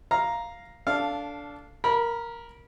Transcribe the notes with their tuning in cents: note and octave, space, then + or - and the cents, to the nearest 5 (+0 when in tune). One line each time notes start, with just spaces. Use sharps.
F5 +0 A#5 +5
D4 -15 A4 +0 F5 +0
A#4 +0 B5 -25